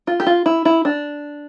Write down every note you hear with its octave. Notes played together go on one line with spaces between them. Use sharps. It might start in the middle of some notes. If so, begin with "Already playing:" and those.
F4
G4
F4
E4
E4
D4